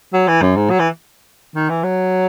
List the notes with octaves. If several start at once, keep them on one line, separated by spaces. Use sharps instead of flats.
F#3
E3
F#2
G#2
F#3
E3
D#3
E3
F#3